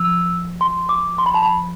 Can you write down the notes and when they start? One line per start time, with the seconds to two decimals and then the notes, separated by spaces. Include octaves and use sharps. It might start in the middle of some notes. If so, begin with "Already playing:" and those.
Already playing: F3 E6
0.61 C6
0.89 D6
1.18 C6
1.26 B5
1.34 A5
1.42 B5